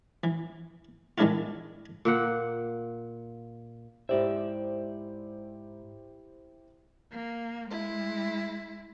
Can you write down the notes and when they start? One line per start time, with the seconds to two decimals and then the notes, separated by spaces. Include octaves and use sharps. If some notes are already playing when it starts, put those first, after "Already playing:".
0.24 E3
1.18 D#3 E3 G#3 D4 E4 F4
2.05 A#2 A#3 F#5
4.09 G#2 E4 G4 C5 D5 E5
7.12 A#3
7.70 G#3 E4